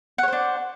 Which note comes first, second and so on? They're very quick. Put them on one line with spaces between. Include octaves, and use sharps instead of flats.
F#5 C#5 C5 D4